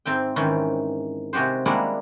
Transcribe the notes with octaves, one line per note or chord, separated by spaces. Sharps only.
G#2 C4 E5 G5
G#2 D#3 E3 C4 C#4
C3 G#3 F#4 G4 C5
G3 G#3 A#3 D4 E4 F#4